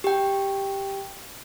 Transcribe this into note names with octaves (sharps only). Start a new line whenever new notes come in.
G4 G5